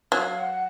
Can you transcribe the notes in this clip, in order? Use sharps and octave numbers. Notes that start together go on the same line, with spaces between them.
F#3 F5
F#5